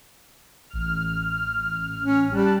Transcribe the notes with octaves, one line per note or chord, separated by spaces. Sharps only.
A1 F6
C#4
G3 G4 A5 F#6